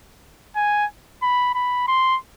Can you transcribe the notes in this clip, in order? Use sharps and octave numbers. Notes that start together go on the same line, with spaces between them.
G#5
B5
B5
C6